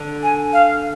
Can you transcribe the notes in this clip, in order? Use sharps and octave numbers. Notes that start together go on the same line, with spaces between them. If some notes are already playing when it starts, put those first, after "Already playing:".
Already playing: D3
G#5
F5